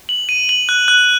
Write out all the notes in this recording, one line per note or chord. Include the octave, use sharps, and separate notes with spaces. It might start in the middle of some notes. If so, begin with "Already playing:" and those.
F#7
D#7
F#7
F#6
F#6